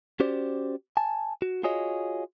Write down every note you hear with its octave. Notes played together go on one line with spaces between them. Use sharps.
C#4 F#4 G4 C5 D5
G#5 A5
F#4
F4 F#4 G#4 C#5 D#5